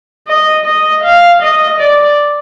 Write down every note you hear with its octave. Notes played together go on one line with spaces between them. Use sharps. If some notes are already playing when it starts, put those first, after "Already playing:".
D#5
D#5
F5
D#5
D5